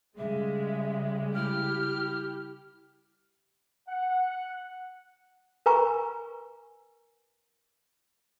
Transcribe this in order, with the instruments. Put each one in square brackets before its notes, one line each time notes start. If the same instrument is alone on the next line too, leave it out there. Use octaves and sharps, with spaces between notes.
[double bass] C#3 G3 [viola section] G#3 [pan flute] E5
[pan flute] E4 [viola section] G4 [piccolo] F6
[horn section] F#5
[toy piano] A#4 B4 G#5 A#5 C#6